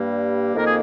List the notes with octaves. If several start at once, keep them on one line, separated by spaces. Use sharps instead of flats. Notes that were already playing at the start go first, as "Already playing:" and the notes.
Already playing: G2 G3 A#3
F2 D#3 A#3 A#4
G#4